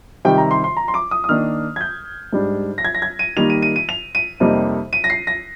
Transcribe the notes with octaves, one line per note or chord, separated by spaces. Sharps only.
C3 D#3 G3 G5
A#5
C6
C6
A#5
C6
D6
D#6
D#6
D#3 A#3 D4 F6
G#6
G6
G#2 G3 D4
A#6
G#6
A#6
G#6
D#7
D#3 G3 A#3 D#4 F7
D#7
D#7
D#7
F7
D#7
F2 C3 G3 A#3 D#4
D#7
A#6
C7
A#6